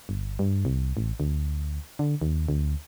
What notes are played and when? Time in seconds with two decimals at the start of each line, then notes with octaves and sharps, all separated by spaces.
0.09 G1
0.39 G2
0.65 C2
0.97 A1
1.20 D2
1.99 D3
2.22 D#2
2.49 D2